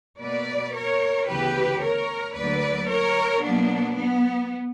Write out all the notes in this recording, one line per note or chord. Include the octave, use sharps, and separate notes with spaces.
B2 A#3 B4 D5
A#4 C#5
D2 C#3 E3 B3 G4 B4
A#4 C#5
D2 D3 F#3 A#3 B4 D5
A#4 C#5
B2 F#3 A#3 B3 D4
B3